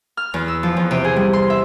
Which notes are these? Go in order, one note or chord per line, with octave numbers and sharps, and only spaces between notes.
F6
E2
E6
F3
E2
C3
G#4
G3
C6
E5